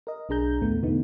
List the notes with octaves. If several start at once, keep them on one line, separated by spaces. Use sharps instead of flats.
A#4 D#5
B1 D4 G#4 A#5 G6
D#2 A2 A3 B3
E2 B2 D3 A3 B3 D#4